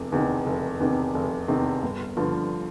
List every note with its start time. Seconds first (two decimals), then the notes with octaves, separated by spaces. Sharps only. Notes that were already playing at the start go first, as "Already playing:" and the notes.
Already playing: F1 E2 C3
0.12 E2 C3 D#3
0.46 F1
0.80 E2 C3 D#3
1.15 F1
1.48 E2 C3 D#3
1.83 G1
2.17 G2 D3 F3